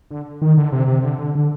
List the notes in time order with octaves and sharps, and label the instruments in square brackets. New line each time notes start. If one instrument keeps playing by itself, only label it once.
[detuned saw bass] D3
D#3
D3
C3
C3
D3
D3
D3